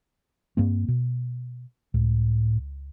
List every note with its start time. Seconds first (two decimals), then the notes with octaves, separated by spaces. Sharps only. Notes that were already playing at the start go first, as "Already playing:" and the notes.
0.57 G2 A#3 C4
0.88 B2
1.94 C#2 A2